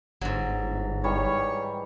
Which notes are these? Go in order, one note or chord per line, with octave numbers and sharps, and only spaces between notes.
G1 G#2 F#3
D#3 E3 G3 C#5